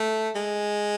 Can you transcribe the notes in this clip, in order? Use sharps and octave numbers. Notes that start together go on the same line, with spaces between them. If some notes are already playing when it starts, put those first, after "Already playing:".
Already playing: A3
G#3